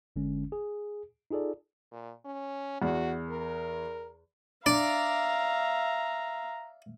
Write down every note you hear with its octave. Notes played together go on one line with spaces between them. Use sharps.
G1 D3 G#3 C#4
G#4
D#4 F4 G#4 A4 D5
A#2
C#4
E2 F#4
A#4
D4 D5 E5 F5 A#5